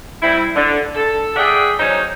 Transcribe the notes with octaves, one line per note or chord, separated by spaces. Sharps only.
G3 C4 E4
D3
A4
G#4 D5 E5 F#5 G5
F#3 C#4 D#4 C5 C#5